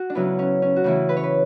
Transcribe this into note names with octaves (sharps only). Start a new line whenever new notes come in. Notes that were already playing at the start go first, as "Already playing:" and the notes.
Already playing: F#4
D4
C#3 F#3 B3 E4
C#4
C#4
F#4
C#3 E3 A3 E4
B4
C#5
B4